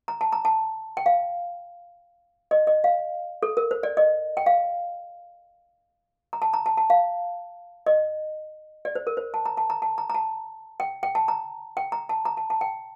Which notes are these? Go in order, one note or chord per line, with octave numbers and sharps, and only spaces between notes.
A#5
A5
A#5
A5
G5
F5
D#5
D#5
F5
A4
A#4
C5
D5
D#5
G5
F5
A#5
A5
A#5
A5
A5
F5
D#5
D5
C5
A#4
C5
A5
A#5
A5
A#5
A5
A#5
A#5
A5
G5
G5
A5
A#5
G5
A#5
A5
A#5
A5
A5
G5